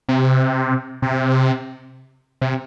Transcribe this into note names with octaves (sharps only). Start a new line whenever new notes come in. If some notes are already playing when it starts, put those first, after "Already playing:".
C3
C3
C3